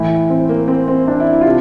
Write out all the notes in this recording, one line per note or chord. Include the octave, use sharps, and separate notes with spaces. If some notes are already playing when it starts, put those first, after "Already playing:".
Already playing: A2 E3 E4
C4
A#3
C4
C4
D4
E4
E4
F4
C3